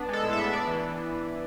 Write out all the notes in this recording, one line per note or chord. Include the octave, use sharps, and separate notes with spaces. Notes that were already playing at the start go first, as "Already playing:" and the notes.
Already playing: B3 D4
G#3 A4
A2
E5
B3
D4 D5
E3